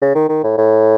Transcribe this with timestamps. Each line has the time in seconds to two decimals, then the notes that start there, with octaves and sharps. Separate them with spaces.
0.02 C#3
0.15 D#3
0.29 D#3
0.44 A2
0.58 A2